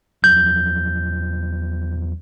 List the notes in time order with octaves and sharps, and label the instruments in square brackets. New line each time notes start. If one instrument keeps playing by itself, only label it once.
[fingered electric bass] E2 F3 F#3 [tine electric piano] G6